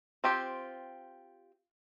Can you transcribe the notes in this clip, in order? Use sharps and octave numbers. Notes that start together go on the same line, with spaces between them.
C4 F4 G4